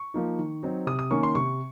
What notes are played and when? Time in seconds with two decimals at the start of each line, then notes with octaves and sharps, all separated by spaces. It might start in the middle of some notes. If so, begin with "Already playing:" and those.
Already playing: C#6
0.14 F3 A#3 D#4
0.39 D#3
0.63 F#3 C4 D#4
0.87 C3 D#6
0.99 D#6
1.11 D#3 A#3 C#4 C#6
1.23 C6
1.35 C3 C#6